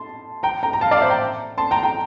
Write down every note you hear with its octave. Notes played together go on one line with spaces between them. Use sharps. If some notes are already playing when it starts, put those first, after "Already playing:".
Already playing: A5 C6
G5 A#5
G5 A#5
A#5
F5 A5
D5 F5
C5 E5
G5 A#5
A5 C6
G5 A#5
G5 A#5